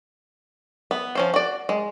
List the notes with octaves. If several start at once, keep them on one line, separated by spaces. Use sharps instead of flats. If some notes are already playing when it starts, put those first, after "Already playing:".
B3
F3 C#4 C5
F#4 D5
G#3